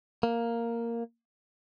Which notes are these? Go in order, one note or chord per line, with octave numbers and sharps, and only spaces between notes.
A#3